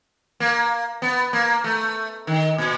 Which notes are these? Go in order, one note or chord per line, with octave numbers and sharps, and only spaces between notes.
A#3
B3
A#3
A3
D#3
A#2